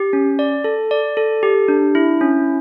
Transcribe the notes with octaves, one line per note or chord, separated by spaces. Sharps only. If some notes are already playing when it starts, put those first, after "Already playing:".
Already playing: G4
C#4
D5
A4
D5
A4
G4
D4
E4
C#4